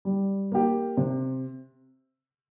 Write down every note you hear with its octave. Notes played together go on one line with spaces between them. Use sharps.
G3
A#3 G4
C3